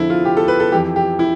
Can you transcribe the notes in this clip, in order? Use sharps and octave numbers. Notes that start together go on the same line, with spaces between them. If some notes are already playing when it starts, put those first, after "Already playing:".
Already playing: F2 D3 F3 E4
F4
G4
A4
B4
A4
F2 E3 G4
G4
E4